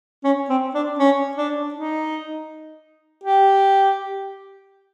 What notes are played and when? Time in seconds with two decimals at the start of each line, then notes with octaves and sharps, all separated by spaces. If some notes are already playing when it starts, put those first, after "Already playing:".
0.24 C#4
0.49 C4
0.74 D4
0.99 C#4
1.37 D4
1.74 D#4
3.24 G4